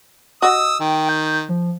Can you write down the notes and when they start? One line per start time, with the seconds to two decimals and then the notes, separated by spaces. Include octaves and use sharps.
0.42 F#4 D#5 D#6 E6
0.80 D#3 G5
1.09 G6
1.49 F3